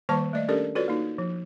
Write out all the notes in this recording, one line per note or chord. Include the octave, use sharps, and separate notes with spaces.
D#3 G3 A#3 C5 A5 C#6
A3 D5 D#5
C#4 D4 G4 A4 A#4 D5
F4 F#4 A4 B4 C#5 D5
A#3 D#4 F#4
F3